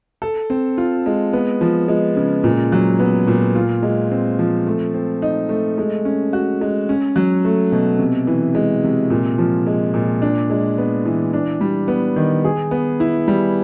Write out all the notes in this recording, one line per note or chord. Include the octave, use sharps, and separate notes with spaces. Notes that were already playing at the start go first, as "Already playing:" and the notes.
A4
C4
F4
G#3
B3
F3
G#3
C#3
A#2
F#3
B3
A#2
F4
G#3
C4
F3
A3
C4
D#4
A3
G#3
C#4
F#4
G#3
C#4
F#3
A3
B2
C3
E3
G#3
C3
A#2
F3
G#3
A#2
D4
G#3
B3
E3
D4
G3
B3
D#3
G#4
B3
E4
G3